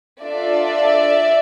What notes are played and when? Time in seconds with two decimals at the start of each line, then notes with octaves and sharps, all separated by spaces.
0.22 D4 F4 A4 D5 E5